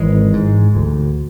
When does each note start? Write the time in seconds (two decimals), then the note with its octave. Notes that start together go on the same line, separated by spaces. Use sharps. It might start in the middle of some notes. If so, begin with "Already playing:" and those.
Already playing: G#1 E3 G#3
0.33 G#2
0.75 D2